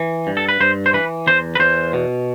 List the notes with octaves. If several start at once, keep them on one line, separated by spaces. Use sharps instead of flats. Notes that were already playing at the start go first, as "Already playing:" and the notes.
Already playing: E3
G2
A4
B4
G2 C5
C5
E3 B4
E2 C5
B4
E2 C5
B2